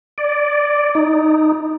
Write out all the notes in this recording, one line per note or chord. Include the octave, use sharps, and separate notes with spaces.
D5
D#4